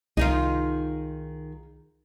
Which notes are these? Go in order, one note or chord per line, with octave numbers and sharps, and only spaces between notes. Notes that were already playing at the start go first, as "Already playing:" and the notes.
C2 D#3 D#4 F4 G#4